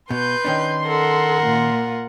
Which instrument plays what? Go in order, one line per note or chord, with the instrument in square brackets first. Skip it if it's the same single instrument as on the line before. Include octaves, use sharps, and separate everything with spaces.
[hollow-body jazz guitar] B2 [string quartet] B4 G6 [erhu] C6
[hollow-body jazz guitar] D#3 C#4 D4
[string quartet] A4 [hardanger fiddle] A#4 F#5
[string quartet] A#2 F4